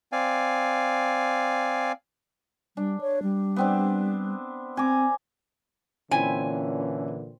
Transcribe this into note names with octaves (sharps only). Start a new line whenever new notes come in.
C4 D5 F5 G#5
G3 D4
C#5
G3
B3 C4 D4
C4 G#5 A#5 D6
A#2 D3 E3 C4 C#4 E4 G#5